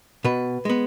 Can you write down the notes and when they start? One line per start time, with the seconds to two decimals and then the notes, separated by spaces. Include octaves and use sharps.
0.24 B2 B4
0.65 G#3 B3